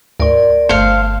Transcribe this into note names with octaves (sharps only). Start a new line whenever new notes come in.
D2 G#2 A#4 D5 C6
G1 G2 A3 C5 F5